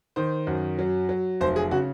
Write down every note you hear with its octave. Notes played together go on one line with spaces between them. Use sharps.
D#3 C5
F#2
F#3
F#3
F1 C5
G#4
C#3 F#4